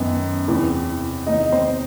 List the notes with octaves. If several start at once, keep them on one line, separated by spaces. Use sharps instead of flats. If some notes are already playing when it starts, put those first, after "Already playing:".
Already playing: F#2 D#3 B3
E2 C3 E3
E2 C3 D#3 D#4 D#5
C4 C5